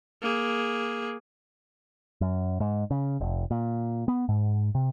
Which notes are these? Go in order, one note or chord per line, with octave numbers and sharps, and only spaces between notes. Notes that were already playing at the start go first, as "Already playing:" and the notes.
A#3 G#4
F#2
G#2
C#3
F1
A#2
B3
G#2
C3